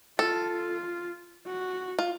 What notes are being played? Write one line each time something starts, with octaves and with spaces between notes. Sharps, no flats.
F4 A4
F#4
F4